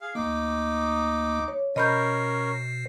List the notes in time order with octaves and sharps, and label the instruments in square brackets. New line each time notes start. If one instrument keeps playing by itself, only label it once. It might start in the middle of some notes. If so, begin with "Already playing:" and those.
[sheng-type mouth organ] G#4 F5
[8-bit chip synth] D2 A#3 [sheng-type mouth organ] D#4 D6
[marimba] C#5
[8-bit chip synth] B2 C5 C7 [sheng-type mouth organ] C#4 A#4 [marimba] D#5 B5 G6